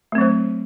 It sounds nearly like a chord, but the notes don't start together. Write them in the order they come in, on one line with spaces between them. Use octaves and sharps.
A3 C4 F#3 C5